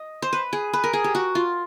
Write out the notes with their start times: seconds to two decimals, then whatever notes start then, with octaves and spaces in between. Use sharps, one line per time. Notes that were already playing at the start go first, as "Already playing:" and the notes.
Already playing: D#5
0.22 C5
0.33 B4
0.53 G#4
0.73 B4
0.84 A#4
0.93 G#4
1.04 G4
1.15 F#4
1.35 F4